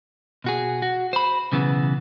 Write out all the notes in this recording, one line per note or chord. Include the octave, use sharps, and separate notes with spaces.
B2 F#4 G#4
F#4
C5 B5
B1 C#3 E3 B3